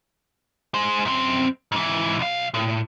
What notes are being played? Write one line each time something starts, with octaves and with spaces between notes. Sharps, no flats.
G#3 C5
F#2 C4
G#2 E3
B1 F5
A2